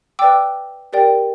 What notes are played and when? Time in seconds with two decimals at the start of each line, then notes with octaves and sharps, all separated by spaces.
0.19 B4 D5 G5 D6 E6
0.93 G4 A#4 D5 G5